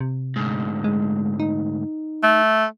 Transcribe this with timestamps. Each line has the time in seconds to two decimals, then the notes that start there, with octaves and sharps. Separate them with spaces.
0.01 C3
0.36 D2 G#2
0.84 G#3
1.40 D#4
2.23 A3